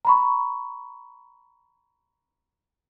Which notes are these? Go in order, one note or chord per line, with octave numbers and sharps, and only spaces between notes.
A#5 B5 C#6